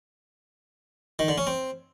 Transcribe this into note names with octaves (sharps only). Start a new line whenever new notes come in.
D#3
D3
C#4
C4